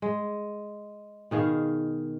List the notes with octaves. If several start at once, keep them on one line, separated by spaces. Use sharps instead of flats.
G#3
B2 D#3 G#4 F5